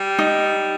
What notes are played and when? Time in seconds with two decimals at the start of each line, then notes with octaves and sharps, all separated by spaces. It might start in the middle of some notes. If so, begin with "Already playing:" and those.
Already playing: G3
0.19 D#4